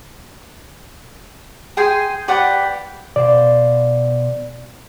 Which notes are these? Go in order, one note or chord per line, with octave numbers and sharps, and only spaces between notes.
G#4 G5 G#5 C6
G4 B4 D5 F#5
B2 C5 D5 F5